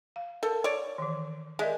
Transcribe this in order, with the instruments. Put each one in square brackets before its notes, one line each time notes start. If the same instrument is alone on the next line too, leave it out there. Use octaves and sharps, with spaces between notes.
[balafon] F5
[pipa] A4 [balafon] A#4
[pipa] C#5 D5
[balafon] D#3 E3
[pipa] G#3 [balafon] A#4 D5 E5